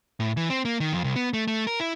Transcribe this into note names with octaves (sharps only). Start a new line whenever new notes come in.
A2
E3
C4
A#3
D#3
F2
C2
B3
A3
A3
A#4
E4